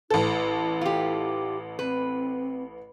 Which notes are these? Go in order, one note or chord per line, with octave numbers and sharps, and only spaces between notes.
A1 E4 A4
F4 G4
C4 B4